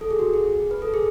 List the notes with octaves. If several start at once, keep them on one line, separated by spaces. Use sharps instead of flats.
A4
G#4
F#4
G#4
B4
A4
G#4